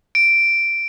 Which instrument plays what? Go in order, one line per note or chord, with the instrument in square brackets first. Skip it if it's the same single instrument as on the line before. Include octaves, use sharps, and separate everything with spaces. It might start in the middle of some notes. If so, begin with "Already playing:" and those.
[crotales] D7